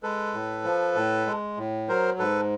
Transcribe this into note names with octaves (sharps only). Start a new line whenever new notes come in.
G#3 A4 B4
A2
F3
A2
G#3
A2
F#3 A#4 C5
G#2 A4 B4